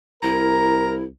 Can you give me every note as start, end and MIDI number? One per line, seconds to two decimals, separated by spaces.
0.23 1.08 36
0.23 1.03 64
0.23 0.97 70
0.23 0.94 82